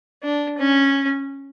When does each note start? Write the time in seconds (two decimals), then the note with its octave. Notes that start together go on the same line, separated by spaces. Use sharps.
0.23 D4
0.58 C#4